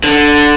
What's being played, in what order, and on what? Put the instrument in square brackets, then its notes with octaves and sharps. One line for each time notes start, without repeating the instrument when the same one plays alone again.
[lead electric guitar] D3